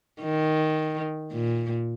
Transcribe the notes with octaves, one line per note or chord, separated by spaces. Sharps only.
D#3
A#2